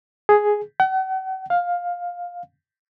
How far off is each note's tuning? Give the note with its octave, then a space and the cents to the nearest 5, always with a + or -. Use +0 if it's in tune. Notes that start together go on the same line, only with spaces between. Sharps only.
G#4 +5
F#5 +45
F5 +15